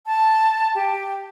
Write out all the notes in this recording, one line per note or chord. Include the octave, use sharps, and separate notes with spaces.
A5
G4